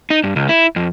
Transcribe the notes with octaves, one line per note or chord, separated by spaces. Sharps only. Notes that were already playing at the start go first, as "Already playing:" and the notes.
D#4
G2
C#2
E4
F2